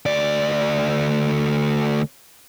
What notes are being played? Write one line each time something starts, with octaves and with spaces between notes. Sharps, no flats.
D2 D5